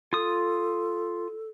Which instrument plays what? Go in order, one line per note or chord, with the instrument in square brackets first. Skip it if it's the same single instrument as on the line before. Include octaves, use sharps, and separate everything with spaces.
[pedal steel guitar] F4 D#6 [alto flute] A4